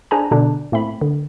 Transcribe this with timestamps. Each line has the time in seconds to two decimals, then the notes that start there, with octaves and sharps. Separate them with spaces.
0.11 D4 G#4 C5 G#5 A#5
0.31 B2 D3 D4
0.72 A2 A3 C4 B5
1.01 D3